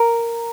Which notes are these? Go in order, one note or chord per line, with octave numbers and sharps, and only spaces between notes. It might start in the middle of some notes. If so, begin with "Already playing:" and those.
Already playing: A#4